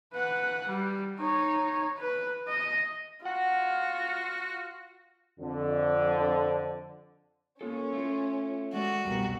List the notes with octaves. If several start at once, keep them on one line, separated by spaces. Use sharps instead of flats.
B4 F#5
G3
D#4 C#5
B4
D#5
F4 F#4 F#5
F2 D3
A#3 C#4 F4 A4
A3 F4
G#3 A3 F#4 D5
C2 F2 B2 G3 A#4